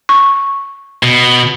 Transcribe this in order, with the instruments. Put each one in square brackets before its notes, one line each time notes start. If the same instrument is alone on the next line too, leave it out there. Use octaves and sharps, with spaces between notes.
[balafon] C#6
[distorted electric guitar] B2